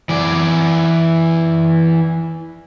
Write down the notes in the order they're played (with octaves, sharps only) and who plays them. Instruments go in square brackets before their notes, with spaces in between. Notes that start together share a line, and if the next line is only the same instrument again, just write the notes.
[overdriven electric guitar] E3 D5